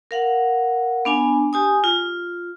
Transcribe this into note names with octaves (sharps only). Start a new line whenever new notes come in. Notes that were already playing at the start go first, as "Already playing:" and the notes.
A#4 F5 F#5
B3 D4 G#5
G4 G#5 D#6
F4